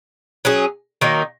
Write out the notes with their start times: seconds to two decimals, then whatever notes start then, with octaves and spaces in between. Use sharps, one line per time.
0.45 F#3 C#4 G#4
1.01 D#3 F#3 A#3 D#4